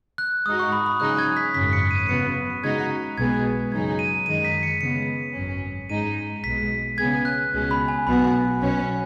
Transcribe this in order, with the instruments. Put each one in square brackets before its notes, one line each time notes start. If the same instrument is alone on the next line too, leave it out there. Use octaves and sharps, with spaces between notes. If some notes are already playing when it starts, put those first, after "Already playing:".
[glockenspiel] F#6
[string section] G#2 G#3 D#4 F#4 [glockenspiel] D#6
[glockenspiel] C#6
B5
B5
[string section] C#3 F#3 D#4 G#4 [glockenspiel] F#6
[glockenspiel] G#6
B6
[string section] G#1 F#2 C#3 [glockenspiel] B6
[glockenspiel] C#7
D#7
[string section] C#3 F#3 B3 [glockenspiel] C#7
[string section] C#3 G#3 D#4 F#4 [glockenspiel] G#6
[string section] B1 B2 G#3 B3 G#4 [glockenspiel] G#6
[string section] F#2 C#3 F#3 D#4 G#4 [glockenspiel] G#6
[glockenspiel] D#7
[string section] F#2 D#3 G#3 D#4 [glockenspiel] D#7
[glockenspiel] B6
C#7
[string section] C#3 G#3 B3 [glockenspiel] C#7
[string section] G#1 F#2 F#3 C#4
[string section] G#2 G#3 D#4 G#4 [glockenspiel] D#7
[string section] B1 B2 G#3 [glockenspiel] B6
[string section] C#3 B3 G#4 [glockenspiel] G#6
[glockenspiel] F#6
[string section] C#2 B2 G#3 C#4
[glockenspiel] B5
G#5
[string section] B1 B2 B3 F#4 [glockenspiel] B5
[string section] B1 B2 F#3 C#4 F#4